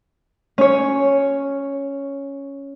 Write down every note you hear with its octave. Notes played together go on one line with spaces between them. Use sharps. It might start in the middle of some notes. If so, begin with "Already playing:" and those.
C#4 C#5